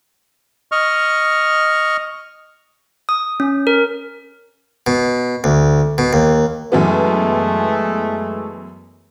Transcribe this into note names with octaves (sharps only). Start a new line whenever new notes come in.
D#5 C#6 F6
D#6
C#4
A#4
B2
D2
B2
D#2
F#2 E3 G#3 A3 B3